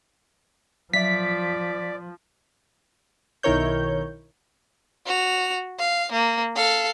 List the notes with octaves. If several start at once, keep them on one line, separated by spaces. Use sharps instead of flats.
F3 F#3 D5 E5 B6
B1 D#3 E4 A#4 C#5 G6
F#4 F7
F5
A#3
A4 F5